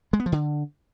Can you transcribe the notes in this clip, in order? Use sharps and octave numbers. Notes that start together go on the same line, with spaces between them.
G#3
B3
F3
D3